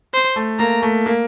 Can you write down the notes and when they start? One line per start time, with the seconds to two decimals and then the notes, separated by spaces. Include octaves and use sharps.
0.14 C5
0.36 A3
0.59 A#3 A#5
0.82 A3
1.06 A#3